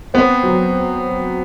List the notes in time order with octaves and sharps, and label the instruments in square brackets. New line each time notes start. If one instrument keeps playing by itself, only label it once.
[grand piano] B3 [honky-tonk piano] C4
[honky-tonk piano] F#3